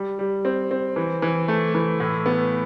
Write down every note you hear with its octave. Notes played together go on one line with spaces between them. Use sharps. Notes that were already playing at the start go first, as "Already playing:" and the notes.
Already playing: G3
G3
C4
C4
E3
E3
A3
E3
A2
B3